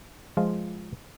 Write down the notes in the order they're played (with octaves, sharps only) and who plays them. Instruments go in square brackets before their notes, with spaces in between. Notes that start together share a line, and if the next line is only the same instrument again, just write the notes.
[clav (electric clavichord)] F3 G#3 F4